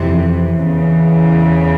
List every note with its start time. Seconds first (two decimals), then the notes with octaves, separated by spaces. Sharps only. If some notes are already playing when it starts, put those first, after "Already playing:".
Already playing: F2 C3 E3 C4
0.62 E2 C#3 E3